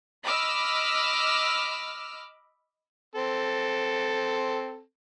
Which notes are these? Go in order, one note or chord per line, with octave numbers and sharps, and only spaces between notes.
D#5 B5 D6 E6 F6
C4 A4